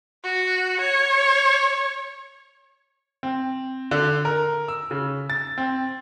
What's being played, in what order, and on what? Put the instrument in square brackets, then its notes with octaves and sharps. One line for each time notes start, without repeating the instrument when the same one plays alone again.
[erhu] F#4
C#5
[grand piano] C4
D3
A#4
E6
C#3
A6
C4